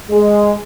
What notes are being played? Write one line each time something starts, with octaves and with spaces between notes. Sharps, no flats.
G#3